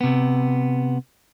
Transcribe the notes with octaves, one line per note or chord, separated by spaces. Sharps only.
C3 B3